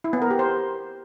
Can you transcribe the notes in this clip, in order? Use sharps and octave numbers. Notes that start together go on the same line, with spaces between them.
E4
B3
A#4
G4
C5